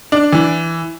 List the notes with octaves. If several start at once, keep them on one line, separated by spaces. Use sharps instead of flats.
D4
E3